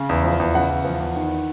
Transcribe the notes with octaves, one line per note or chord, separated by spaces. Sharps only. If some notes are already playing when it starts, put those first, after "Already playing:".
Already playing: C#3
E2
F3
E2
C#3 F#5
E2
F3
E2
D#3